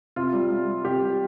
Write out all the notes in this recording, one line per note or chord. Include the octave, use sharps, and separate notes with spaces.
C3 F4
G3
G3
G3
C3 G4
G3